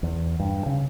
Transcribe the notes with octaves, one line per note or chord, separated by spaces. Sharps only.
E2
G2
C#3